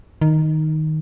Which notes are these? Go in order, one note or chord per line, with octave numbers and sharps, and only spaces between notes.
D#3